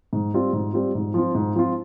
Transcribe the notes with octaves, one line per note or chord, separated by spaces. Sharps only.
G#2
G3 C4 F4
G#2
G3 C4 F4
G#2
F3 C4 F4
G#2
F3 C4 F4